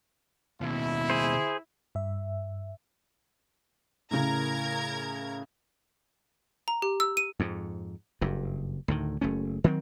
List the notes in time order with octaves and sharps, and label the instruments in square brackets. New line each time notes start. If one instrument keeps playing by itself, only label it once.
[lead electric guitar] D#2 B2 [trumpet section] E4
[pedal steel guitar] G#4 C5
[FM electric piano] G2 E5
[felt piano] A2 C#3 [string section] A#4 A#5 G#6
[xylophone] A#5
G4
E6
D#7
[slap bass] F2 G#2
F#1 G2
D2 A2 D#3
F#1 A3 C#4
D#3 F#3 B3 C4